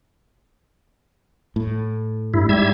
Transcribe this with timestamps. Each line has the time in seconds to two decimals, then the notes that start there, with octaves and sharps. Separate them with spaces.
1.56 A2
2.34 G2 E4
2.49 G#2 G3 E5 G#6